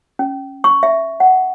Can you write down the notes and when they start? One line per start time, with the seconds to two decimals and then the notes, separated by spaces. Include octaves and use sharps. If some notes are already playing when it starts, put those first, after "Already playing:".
0.19 C#4
0.64 C#6
0.83 E5
1.20 F#5